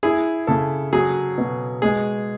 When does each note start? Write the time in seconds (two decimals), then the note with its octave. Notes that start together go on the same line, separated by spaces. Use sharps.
0.03 E4 G#4
0.47 C#3 A4
0.93 F#3 G#4
1.38 B2
1.82 G#3 G#4